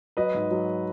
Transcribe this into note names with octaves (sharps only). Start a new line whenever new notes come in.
F#3 B4 D#5
G#2
F#3